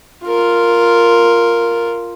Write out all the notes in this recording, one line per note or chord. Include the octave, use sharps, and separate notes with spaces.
F4 A#4